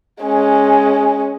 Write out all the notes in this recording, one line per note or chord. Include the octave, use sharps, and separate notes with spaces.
G#3 C#4